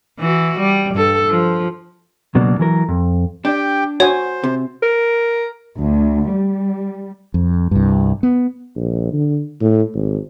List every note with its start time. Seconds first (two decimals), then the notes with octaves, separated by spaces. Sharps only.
0.19 E3 F#4
0.58 G3
0.94 G2 A4
1.28 F3
2.35 C#2 B2 F#3 A#3 D4
2.59 E3 F#3 A#4
2.88 F2
3.45 D4 G4 G5
4.00 F#4 C5 C#5 G#5
4.44 C3
4.83 A#4
5.77 D2
6.30 G3
7.34 F2
7.71 C2 G2
8.23 B3
8.76 A#1
9.13 D3
9.61 A2
9.94 G#1